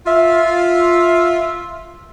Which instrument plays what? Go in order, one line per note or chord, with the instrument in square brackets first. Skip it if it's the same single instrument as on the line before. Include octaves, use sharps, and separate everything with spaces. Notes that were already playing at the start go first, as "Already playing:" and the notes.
[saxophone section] F4 E5